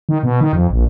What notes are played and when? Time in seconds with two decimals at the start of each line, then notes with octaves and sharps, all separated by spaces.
0.09 D#3
0.23 B2
0.41 D#3
0.53 F2
0.71 A#1